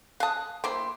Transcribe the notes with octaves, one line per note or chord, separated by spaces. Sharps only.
F5 A5 D#6 F#6
A#3 E4 C5 G5 C6